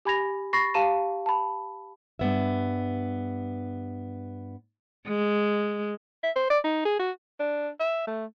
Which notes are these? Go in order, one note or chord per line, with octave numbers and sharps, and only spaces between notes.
G4 G#5 B5 G#6 A#6 F7
B5 C#6 A6 A#6 C7
G4 F5 A5 A#5 D#7 E7
A5 B5
G2 B3 E5
G#3
E5
C5
D5
D#4
G#4
F#4
D4
E5
A3